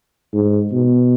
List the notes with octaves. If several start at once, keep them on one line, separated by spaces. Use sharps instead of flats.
G#2
B2